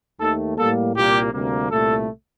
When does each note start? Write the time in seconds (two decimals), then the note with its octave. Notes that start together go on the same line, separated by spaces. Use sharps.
0.20 D#2 D#3 A3 A4
0.57 A2 G3 A#3 A4
0.96 C2 A#2 G3 A#3 G4
1.33 D2 C3 G3 A#3
1.71 C2 A#2 A3 A4